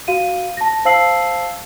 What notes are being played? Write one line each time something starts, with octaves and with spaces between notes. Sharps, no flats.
F#4 F5 D#7
A5 A#6
C5 F5 A5 E6 C7 F#7